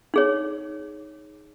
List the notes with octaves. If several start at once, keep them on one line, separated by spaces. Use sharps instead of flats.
D#4 G#4 C#5